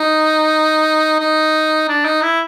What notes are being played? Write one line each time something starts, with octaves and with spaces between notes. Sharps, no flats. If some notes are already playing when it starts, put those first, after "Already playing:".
Already playing: D#4
D#4
D4
D#4
E4